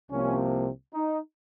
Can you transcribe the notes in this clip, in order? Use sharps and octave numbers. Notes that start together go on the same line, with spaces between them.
C2 C3 F3 A#3 C#4
D#4